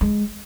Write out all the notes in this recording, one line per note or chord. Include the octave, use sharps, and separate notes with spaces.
G#3